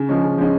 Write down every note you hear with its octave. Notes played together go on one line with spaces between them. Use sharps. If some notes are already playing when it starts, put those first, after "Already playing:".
Already playing: C#3
F3 G#3 C#4
C#3
F3 G#3 C#4